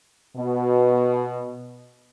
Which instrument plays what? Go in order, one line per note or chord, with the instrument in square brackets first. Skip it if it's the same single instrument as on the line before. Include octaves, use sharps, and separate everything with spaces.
[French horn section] B2